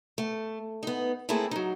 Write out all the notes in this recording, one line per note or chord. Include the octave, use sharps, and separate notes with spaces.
A3
B3 D#4
A3 A#3 C4 E4 G#4 A4
F#3 D#4